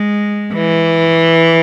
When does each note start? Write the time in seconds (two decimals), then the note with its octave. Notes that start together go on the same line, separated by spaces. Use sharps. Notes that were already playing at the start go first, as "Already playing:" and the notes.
Already playing: G#3
0.53 E3